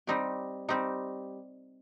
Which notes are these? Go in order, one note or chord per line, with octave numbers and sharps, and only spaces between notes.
G3 C4 D#4 G4
G3 C4 D#4 G4